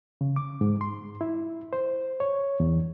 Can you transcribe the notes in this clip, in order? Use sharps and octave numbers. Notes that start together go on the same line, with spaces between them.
C#3
D6
G#2
C6
E4
C5
C#5
E2